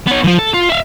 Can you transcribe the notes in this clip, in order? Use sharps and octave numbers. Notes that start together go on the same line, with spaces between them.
B3 C#5
E3 F3
A4
F4
E5 F5